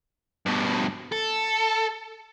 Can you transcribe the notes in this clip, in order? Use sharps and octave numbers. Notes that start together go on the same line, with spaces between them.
G2 B2
A4